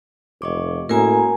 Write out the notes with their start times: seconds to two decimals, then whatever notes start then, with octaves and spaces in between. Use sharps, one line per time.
0.42 F1 D#5 C#6 D6
0.89 A2 A#3 C#4 F#4 A#4 G#5 A#5